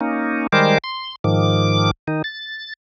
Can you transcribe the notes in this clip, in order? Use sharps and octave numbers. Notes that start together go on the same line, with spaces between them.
A#3 C#4 D#4
D#3 G3 G#3 A#4 C5 D6
C6
G#2 D#3 F3 D6
D#3 D#4
A6